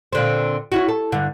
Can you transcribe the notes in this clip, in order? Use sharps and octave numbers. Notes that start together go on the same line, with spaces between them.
A#2 D3 C4
C#4 E4 F#4
A4
G2 D3